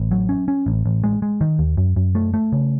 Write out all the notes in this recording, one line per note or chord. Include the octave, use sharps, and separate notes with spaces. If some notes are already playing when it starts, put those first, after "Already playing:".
Already playing: A1
F#3
C#4
C#4
A1
A1
G#3
G#3
D#3
D#2
F#2
F#2
A3
A3
C#3